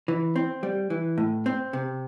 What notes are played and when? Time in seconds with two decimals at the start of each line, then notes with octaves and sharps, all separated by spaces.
0.08 E3
0.36 C4
0.63 G3
0.90 E3
1.18 A2
1.46 C4
1.73 C3